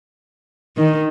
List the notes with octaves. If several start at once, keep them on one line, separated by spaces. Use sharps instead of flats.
D#3